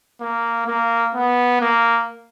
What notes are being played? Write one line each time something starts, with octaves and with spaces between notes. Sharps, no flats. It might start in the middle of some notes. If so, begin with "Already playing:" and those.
A#3
A#3
B3
A#3